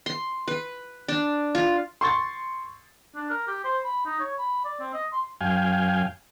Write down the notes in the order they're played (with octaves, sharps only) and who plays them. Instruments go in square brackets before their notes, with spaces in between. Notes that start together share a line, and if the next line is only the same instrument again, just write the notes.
[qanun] C6
B4
D4
F4
[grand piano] C6 C#6 A6
[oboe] D4
A#4
G4
C5
B5
D#4
C#5
B5
D5
C4
D#5
C6
[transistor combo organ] F#2 F5 G5 G#5